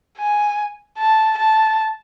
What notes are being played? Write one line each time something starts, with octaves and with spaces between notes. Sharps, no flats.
G#5
A5
A5